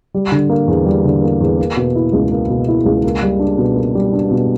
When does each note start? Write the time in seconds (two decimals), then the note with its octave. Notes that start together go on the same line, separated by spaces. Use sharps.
0.14 G3
0.32 D3
0.49 A#3
0.68 E2
0.86 G3
1.05 D3
1.22 A#3
1.41 E2
1.58 A#3
1.76 B2
1.96 E4
2.13 C#2
2.32 A#3
2.49 B2
2.68 E4
2.86 C#2
3.04 A#3
3.23 G3
3.39 D4
3.58 B2
3.76 A#3
3.95 G3
4.13 D4
4.31 B2